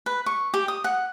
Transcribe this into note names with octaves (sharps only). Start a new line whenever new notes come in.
B4
C#6
G4
D#6
F#5